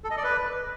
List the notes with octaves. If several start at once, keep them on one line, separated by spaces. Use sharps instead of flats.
A4
D#5
D5
B4